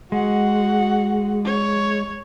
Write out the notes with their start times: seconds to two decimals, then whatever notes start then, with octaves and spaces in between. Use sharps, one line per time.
0.12 G#3 F#4 F#5
1.45 C#5